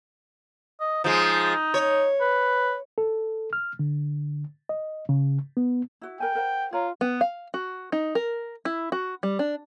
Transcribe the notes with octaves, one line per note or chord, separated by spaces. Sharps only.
D#5
F3 G#3 D#4
C#5
B4
A4
F6
D3
D#5
C#3
B3
E4 F#4
A#4 G5 G#5
A#4 C5 F#5
F4 C#5 F5 A#5
B3
F5
F#4
D#4
A#4
E4
F#4
G3
D4